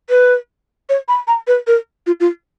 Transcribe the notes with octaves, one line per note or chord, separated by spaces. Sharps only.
B4
C#5
B5
A#5
B4
A#4
F4
F4